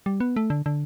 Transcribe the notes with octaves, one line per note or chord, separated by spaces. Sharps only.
G3
B3
A3
D3
D3